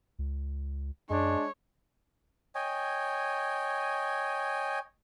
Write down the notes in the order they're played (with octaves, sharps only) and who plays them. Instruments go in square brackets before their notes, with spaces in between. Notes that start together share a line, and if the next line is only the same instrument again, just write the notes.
[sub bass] C#2
[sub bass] F#2 [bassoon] G#3 [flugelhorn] D4 [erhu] C#5
[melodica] C#5 D#5 G5 G#5